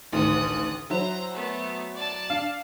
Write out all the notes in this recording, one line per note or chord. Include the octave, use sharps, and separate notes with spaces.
A1 D2 D#3 D#6 F#6
F#3 E4 C5 A#5
A3 B3
D5 A5
D4 F5